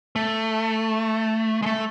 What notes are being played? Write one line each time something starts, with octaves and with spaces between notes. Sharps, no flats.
A3
G#3
A3